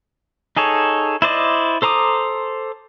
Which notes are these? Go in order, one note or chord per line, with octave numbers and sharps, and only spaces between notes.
D#4 G#4 A4 C#5
E4 C5 D5 D#5
A4 C5 A#5 D6 D#6